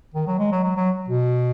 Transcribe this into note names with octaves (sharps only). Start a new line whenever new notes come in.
D#3
F#3
G#3
F#3
F#3
F#3
B2